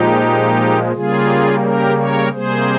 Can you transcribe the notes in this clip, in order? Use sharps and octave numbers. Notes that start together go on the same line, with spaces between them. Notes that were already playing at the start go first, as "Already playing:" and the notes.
Already playing: A#2 F3 G#3 D#4 G4
C#3 G3 A#3 F4 G#4
G4 A#4
A#4 C#5
C3 G3 A#3 G#4 C5